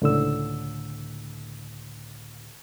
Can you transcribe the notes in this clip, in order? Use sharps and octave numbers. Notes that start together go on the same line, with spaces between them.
C#2 A2 D3 E6